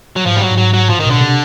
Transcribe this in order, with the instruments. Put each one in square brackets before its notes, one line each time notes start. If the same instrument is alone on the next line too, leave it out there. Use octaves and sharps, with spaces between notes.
[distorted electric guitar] F#3
[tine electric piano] G#2 [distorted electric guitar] F3
[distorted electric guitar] G3
F#3
[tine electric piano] G#2
[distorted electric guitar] F#3
F#3
[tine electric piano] A2 [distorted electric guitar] F3
[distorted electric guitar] D#3
[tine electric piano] B1 B2 [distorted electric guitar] D3
[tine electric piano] C3